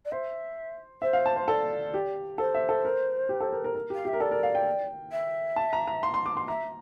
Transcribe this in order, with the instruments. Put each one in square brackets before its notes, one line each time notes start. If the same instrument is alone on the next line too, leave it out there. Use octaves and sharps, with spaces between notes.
[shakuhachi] D5
[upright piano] C5 [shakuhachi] E5
[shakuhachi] C5 [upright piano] E5
[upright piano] F5
A5
C5
[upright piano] A4 [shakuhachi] D5
[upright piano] G4
[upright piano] A4 [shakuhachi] C5
[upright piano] E5
A4
A#4
G4
A4
A#4
A#4
A#4
[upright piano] G4 [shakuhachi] F5
[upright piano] G4 [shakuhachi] E5
[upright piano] A#4
[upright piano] A4 [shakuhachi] D5
[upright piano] A#4
F5
G5
[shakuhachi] E5
[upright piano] A5
A#5
A#5
C6
C6
D6
C6
[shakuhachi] E5 [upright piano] A#5